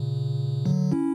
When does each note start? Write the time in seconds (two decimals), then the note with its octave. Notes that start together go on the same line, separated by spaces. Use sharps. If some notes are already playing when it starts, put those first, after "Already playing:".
Already playing: A#2 C#3
0.65 D3 F#3
0.92 C#4 E4